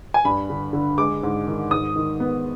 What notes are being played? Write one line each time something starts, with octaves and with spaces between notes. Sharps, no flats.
G#5
G2 B5
D3
D3
G#3 D6
G#2
D#3
G#2 D#6
D#3
B3